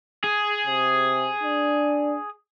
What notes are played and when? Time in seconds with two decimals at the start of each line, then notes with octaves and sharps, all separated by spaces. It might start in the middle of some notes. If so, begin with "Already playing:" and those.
0.24 G#4
0.66 C3
1.43 D4